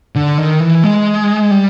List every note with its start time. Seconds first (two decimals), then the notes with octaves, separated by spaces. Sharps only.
0.16 D3
0.38 D#3
0.60 E3
0.84 G#3
1.51 G3